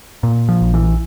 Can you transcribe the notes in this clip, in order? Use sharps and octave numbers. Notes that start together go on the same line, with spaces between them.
A#2
F3
A#1
E3